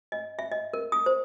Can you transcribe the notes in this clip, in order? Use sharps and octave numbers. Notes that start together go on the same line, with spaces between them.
D#5
E5
D#5
A#4
D#6
C5